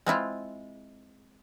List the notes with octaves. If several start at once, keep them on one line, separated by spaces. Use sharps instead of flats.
G#3 C4 E4 F4